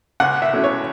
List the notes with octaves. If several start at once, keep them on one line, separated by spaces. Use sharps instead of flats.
C#2 F#5
E5
B2 A3 C#4 E4
C#5